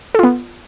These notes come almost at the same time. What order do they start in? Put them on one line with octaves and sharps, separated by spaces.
A4 F4 B3